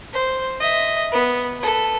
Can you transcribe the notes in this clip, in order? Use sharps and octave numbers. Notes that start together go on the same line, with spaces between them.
C5
D#5 E5
B3
A4 B4